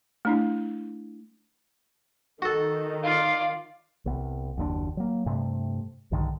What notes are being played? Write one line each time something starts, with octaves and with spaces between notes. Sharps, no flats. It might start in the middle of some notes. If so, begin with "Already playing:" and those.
A3 D4 E4
D#3 F#4 A4
F4 D5 F5
C2 B3
F#1 D#2 C#3 D4
F#3 A#3
G2 C3 A3
B1 G2 D3 D#3